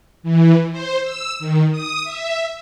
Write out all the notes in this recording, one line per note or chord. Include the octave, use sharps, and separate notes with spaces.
E3
C5
E6
D#3
D#6
E5